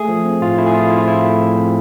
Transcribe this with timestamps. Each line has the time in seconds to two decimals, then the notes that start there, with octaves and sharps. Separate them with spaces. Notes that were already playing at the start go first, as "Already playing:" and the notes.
Already playing: A3 G#4
0.09 F3
0.25 C4
0.41 A2 F4
0.58 A3 E4
0.66 G#4
0.74 F3 F4
0.90 C4 E4
0.99 F4
1.07 A2 E4
1.24 A3
1.40 F3
1.56 C4